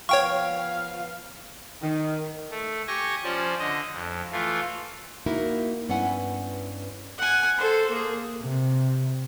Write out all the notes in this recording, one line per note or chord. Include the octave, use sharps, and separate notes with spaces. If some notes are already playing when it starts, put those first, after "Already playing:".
F3 B3 C#5 F5 G5 C#6
D#3
A3
G4 G#5 C#6 A#6
F3 C#4 C5 D5
D3 D#5
F2
E3 A3 F4
A#3 D#4 E4 F#4 A#4
G2 B3 C#4 E4 F#5 G#5
F#5 G#5
A4 C5
A#3 G#4
C3